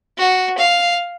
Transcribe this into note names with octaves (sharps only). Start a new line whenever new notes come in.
F#4
F5